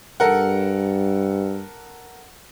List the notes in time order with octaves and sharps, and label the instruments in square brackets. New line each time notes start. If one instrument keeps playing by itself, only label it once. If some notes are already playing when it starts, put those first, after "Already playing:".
[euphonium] G2 [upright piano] A4 A#4 F#5